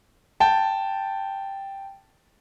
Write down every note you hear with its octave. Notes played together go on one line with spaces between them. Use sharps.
G5 A5